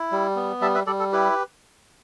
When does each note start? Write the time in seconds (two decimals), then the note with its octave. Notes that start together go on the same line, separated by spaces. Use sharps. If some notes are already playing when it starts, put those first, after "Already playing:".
Already playing: E4
0.12 G3
0.36 B3
0.61 G3 E5 A5
0.75 B4 E5
0.87 G3 A4 D5
0.99 A4
1.12 E4 G4 B4